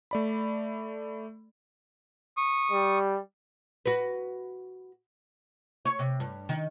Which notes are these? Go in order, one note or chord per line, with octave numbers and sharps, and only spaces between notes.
A3 D5 B5
C#6 D#6
G3
F#4 B4
C#5
C3
G2
D#3